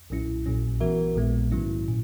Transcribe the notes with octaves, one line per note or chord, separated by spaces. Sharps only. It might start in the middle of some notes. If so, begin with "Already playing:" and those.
B1 A#2 F#3 C#4 E4
A#1 A#2 F#3 C#4
E3 B3 F#4 A#4 E5
A#1 A#2 G#3 B3
G#2 D#3 F#3 C#4 E4
A#2